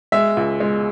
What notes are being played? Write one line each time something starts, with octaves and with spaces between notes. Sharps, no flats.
G#3 E5
C#2
G#3